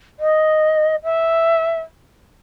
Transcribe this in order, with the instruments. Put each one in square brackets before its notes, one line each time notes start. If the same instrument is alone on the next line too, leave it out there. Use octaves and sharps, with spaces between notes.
[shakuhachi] D#5
E5